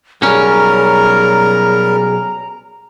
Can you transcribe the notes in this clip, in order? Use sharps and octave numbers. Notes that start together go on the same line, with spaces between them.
B1 G3 C#4 G#4 A#4 A#5